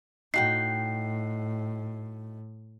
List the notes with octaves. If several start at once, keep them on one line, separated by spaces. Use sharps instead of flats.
A2 D#4 F#4 G5 C7